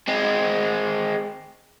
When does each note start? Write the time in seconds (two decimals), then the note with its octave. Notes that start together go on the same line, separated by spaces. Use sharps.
0.08 G#3 C4